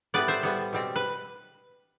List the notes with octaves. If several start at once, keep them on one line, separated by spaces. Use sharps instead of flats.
A2 G3 B3 B4 D5
C5 E5
A2 G3 B3
B2 G3 C4
B4